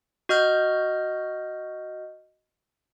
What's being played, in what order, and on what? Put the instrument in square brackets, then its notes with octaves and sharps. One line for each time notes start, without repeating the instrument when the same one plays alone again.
[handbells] F#4 D#5 F6 G6